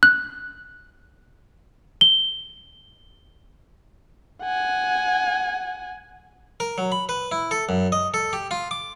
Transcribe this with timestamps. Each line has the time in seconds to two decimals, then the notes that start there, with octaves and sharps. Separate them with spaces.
0.03 F#6
2.01 G7
4.43 F#5 G#5
6.60 A#4
6.78 F#3
6.92 B5
7.09 B4
7.32 E4
7.51 A4
7.69 F#2
7.92 D#5
8.14 A4
8.33 G4
8.51 F4
8.71 D6